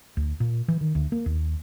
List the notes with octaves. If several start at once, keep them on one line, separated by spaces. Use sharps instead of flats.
D2
A#2
E3
D#3
D2
A#3
D#2